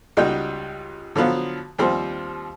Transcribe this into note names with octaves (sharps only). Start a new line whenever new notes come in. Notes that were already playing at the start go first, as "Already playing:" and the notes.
C#2 G3 D#4 F#4 G5
D3 F3 F#3 B3 F4
D#2 F3 G3 C4 C5